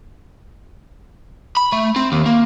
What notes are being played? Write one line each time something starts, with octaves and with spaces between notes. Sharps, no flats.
B5
A3
C4
D#2
A#3